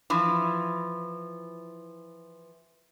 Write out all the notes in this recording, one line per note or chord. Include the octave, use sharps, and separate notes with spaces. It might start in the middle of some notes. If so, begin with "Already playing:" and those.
E3 F3